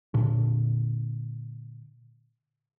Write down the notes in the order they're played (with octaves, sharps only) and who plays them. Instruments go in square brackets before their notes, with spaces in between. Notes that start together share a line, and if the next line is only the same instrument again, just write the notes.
[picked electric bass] A#2 D3